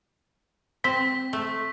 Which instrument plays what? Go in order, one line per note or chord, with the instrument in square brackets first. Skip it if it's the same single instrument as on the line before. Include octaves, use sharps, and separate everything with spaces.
[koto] C4 [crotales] B6
[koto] A3